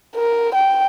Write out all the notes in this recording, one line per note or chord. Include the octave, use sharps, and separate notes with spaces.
A#4
G5